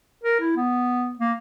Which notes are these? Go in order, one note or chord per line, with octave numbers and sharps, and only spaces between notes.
A#4
E4
B3
A#3